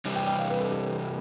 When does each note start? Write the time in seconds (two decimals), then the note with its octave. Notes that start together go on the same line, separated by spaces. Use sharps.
0.05 C3 E3 G3
0.16 G5
0.27 G5
0.39 F5
0.50 B4
0.60 A4
0.71 G4
0.80 A4